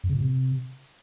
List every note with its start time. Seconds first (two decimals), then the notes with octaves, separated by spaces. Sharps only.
0.04 F#2
0.09 C#3
0.15 A#2
0.21 C3